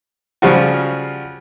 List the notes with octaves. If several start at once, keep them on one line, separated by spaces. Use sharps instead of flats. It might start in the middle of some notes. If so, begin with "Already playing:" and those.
C#3 F3 G3 F4 F#4